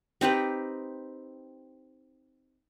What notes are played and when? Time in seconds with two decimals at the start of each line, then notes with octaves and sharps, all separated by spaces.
0.21 C4 D#4 G4 B4